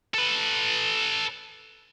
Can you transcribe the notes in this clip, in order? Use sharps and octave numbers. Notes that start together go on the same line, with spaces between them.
A4 B4